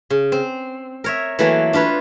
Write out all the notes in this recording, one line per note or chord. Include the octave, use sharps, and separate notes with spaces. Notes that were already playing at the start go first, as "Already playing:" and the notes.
C#3
C4
A#4 C#5 E5
E3 F#3 A3 A#3 C#5
D4 F4 B4 C#5